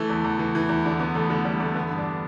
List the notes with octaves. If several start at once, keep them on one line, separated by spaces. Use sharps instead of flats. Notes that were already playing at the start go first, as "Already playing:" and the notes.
Already playing: E3 A3
E2
E2
E3
E3
E2
D3 D4
E2 B3
E2 A3
D3 A3
D3 G3
E2 A3
D3 B3
G2
D4